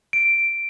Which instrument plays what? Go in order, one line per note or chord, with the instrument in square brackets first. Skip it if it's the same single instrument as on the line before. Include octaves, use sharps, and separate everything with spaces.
[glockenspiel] D7